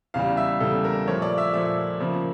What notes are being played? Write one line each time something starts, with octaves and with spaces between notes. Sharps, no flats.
E2 C#3 G3 F5
E5
E2 C#3 G3 A4
A#4
A#2 F3 A3 C#5
D5
E5
A#2 F3 A3 E5
C#3 F3 A#3